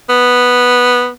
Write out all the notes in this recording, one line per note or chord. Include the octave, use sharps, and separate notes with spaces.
B3